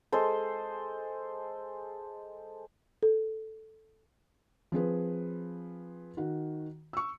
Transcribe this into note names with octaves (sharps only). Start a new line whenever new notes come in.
G#3 A4 C5
A4
F3 C4 G#4 B4
D#3 F#4
C#6 E6